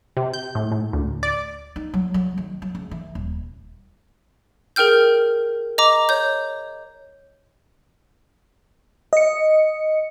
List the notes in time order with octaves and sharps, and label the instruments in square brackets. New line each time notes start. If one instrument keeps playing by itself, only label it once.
[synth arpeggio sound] C3
G6
A2
A2
D2
D5
[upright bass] D#4
F#3
F#3
D#3
F#3
C#2
E3
D#1
[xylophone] G#4 A#4 G5 F6 G6
D#5 A#5 D6
C#5 G6
[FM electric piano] D#5 C#7